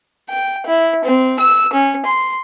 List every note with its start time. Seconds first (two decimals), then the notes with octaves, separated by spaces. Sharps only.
0.30 G5
0.66 E4
1.04 C4
1.40 E6
1.73 C#4
2.06 C6